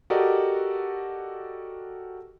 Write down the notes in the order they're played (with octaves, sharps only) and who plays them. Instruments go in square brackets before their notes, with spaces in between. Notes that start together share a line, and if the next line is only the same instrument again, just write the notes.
[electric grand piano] F#4 G4 A4 A#4 D5 D#5